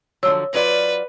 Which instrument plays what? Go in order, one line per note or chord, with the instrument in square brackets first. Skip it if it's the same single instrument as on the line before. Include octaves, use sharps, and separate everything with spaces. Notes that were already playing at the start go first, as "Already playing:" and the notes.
[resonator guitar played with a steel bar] D3 F3 F#3 [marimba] C#5 E6
[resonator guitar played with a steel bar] F#3 F4 D5 [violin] B4